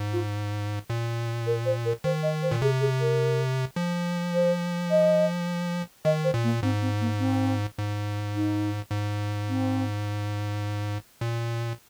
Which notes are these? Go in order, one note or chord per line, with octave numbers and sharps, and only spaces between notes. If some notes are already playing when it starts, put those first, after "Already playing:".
Already playing: G#2
F4
A#2
A#4
C5
A#4
D#3 C5
D#5
C5
A#2
C3 G#4
G#4
A#4
F3
C5
D#5
D#3 D#5
C5
A#2
A#3
G#2 C4
C4
A#3
C4
G#2
D#4
G#2
C4
A#2